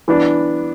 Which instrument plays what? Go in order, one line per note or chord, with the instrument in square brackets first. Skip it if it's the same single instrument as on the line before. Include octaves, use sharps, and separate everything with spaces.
[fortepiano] E3 B3 D4